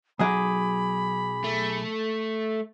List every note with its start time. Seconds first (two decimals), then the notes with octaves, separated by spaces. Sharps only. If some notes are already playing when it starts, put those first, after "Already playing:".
0.19 B1 F#3 G#4 D#5 G#5 B5 D6
1.44 A3